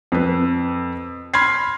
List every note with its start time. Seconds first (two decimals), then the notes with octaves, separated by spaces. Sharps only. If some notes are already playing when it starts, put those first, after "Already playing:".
0.12 F2 B4
1.34 B5 C6 F6 G#6 C7